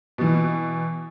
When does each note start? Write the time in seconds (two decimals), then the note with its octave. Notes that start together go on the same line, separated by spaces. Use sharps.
0.18 B2 E3